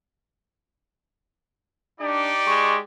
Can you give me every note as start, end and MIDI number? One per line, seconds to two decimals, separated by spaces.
2.00 2.31 62
2.00 2.78 63
2.00 2.78 67
2.00 2.78 74
2.47 2.79 56
2.47 2.75 85